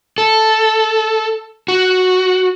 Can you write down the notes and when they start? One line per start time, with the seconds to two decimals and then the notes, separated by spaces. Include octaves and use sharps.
0.18 A4
1.68 F#4